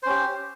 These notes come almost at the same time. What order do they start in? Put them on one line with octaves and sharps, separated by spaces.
C5 C#4 G4